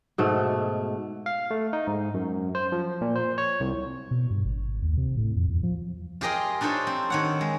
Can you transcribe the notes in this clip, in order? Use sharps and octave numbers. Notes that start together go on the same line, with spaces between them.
G#2 B2 A3
F5
A3
D#4
G#2
F#2
C5
F3
A#2
C5
C#5
C2
B2
G2
G#1
D#2
C3
A2
F2
E2
F3
F4 G4 G#4 A#4 D#5 G5
D4 D#4 F4 A4 C5 C#5
C4
D#3 C#5 F#5
G#3